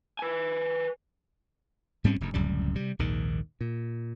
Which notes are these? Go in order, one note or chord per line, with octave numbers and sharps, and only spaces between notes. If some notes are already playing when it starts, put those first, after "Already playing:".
B4 G#5
G#2 G3 C4 C#4
F1 G2
D1 C#2 F#2 G3
C3 G3
A#1 D#2 G#2 D#3
A#2